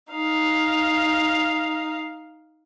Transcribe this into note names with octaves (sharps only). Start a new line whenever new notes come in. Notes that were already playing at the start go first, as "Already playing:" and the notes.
D#4 F5